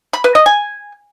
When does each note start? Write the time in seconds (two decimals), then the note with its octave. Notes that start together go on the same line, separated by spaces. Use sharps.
0.13 B5
0.24 B4
0.35 D#5
0.46 G#5